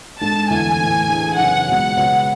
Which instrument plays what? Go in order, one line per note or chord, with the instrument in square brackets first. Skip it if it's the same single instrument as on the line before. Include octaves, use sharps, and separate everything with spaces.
[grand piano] G#2 G#3 D4 A4 [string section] A5
[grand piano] E2 D3 A3 E4 [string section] G#5
[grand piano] A2 E3 A3
E3 A3 D4 G#4
[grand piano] F#2 C#3 E3 B3 E4 [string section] F#5
[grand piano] C#2 B2 F#3 [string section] F#5
[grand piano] C#2 C#3 F#3 B3